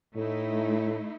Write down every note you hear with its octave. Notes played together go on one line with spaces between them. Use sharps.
A2 A3 D#4 E4